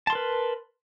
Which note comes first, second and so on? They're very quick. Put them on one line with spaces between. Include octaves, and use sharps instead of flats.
A5 C6 A#4 B4